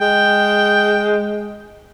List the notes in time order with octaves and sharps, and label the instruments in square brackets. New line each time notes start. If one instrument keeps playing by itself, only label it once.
[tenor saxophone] G#3 [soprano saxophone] G5